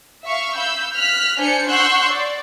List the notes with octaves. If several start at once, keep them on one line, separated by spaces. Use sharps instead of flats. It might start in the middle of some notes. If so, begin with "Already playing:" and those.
E5 F5 C#6
F5 B5 E6 G6
F6 F#6 B6
D4 C5 D5 G#5 G6 C#7
F#5 C6 C#6 E6 F#6 G6
D5